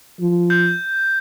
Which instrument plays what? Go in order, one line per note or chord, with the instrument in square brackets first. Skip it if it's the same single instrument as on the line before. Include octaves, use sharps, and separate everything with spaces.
[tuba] F3
[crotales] G6